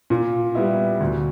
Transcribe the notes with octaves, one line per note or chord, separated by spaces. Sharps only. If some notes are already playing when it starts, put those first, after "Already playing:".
A#2
G3 B3 E4
D2